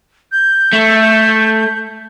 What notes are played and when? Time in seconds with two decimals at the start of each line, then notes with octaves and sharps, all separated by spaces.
0.32 G6
0.73 A3